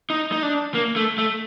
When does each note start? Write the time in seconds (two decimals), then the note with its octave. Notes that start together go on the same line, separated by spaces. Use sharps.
0.10 D#4
0.32 D#4
0.43 D4
0.74 A#3
0.96 A3
1.18 A3